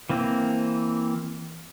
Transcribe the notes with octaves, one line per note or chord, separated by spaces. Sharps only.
E3 A#3 C4